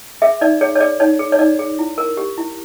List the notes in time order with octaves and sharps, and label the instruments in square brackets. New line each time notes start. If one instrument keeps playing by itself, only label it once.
[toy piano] G#4 E5
D#4 D5
G#4 C#5
C#5
G#4 D5
D#4 C#5
G#4
C#5
D#4 D5
G#4
E4
A#4
G4
E4